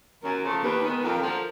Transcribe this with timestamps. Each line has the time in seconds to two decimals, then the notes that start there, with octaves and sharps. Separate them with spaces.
0.23 F#2 A#4
0.43 C#3 F3 A3
0.63 D#2 B4
0.83 D#3 G#3 B3
1.03 F2 A#4
1.23 D3 F3